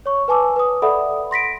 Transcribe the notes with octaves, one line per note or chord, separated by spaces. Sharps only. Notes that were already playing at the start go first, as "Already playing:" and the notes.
C#5 C#6
B4 G#5 A5 D6 E6
B4 D#6
A4 D5 E5 F#5 B5 D#6
C6 A#6 B6 D7